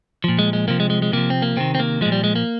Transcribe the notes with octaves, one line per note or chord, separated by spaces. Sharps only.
A#2 F3
G#3
G#3
C3 F3 A#3
G#3
G#3
G#3
C3 F3 A#3
C4
A#3
C3 D#3 C4
C4
A#3
A#2 F3 G#3
G3
G#3
A#3